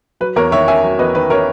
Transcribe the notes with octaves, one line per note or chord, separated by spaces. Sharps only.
F#3 B4
E2 A#4 C#5
D#3 C#5 E5
C#4 E5 G#5
F#3
E2 B4 D#5
D#3 B4
C#4 A#4 C#5